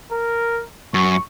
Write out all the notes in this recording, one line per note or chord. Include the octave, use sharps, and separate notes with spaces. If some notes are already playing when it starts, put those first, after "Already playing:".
A#4
F#2 C#6